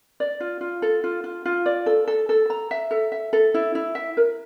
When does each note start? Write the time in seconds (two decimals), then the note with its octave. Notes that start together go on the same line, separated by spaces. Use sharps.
0.20 D5
0.40 F4
0.61 F4
0.82 A4
1.04 F4
1.24 F4
1.45 F4
1.66 D5
1.86 A4
2.07 A4
2.29 A4
2.50 A#5
2.71 E5
2.91 A4
3.12 E5
3.33 A4
3.54 E4
3.75 E4
3.95 E5
4.17 A#4